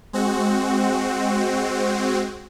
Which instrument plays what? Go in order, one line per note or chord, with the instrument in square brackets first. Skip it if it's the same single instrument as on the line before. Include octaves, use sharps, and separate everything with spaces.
[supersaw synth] G#3 C4 F#4